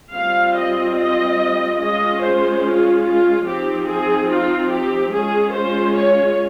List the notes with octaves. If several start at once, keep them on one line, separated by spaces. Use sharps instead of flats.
G3 C4 F4 F5
D#5
D#5
G#3 C#4 F4 D#5
C5
F4
F4
F3 C4 D#4 G4
G#4
F4
G4
G#3 C#4 F4 G#4
C5
C#5